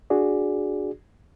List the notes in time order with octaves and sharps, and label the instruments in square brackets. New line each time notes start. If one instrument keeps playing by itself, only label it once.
[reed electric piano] D4 F#4 G#4 D5